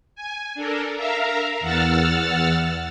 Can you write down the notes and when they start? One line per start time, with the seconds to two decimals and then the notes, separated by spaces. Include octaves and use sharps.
0.15 G#5
0.55 D4 A4 A#4
0.96 A#4 E5 F5 A#5
1.60 E2 F#5 E6 F6 A6